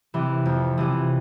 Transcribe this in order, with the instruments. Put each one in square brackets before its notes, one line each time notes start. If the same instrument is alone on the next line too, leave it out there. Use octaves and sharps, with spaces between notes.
[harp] C3 E3
F2
C3 E3